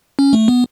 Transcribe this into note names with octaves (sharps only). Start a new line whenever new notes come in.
C#4
A3
B3